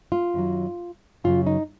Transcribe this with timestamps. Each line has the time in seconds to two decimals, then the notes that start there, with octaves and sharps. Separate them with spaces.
0.12 F4
0.34 F#2 D#3 F#3
1.24 F#2 C#3 F#3 F4
1.47 D#4